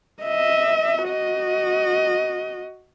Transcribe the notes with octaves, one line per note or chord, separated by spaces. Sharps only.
D#5 E5
F#4 D#5